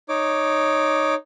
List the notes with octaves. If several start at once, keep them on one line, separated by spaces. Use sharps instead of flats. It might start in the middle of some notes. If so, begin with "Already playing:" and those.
D#4 C#5 D6